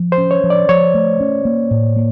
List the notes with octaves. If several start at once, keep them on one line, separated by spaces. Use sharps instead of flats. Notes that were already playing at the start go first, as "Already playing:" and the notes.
Already playing: F3
C5
C#4
C#5
F3
D5
F3 C#5
A3
C#4
A#3
A2
A#3